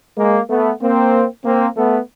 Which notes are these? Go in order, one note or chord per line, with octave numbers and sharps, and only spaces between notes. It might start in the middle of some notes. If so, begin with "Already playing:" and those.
G#3 A#3
A3 B3
A#3 C4
A#3 C4
A3 B3